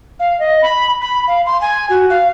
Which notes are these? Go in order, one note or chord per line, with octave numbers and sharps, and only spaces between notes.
F5
D#5
B5
B5
F5
C6
G#5
F#4
F5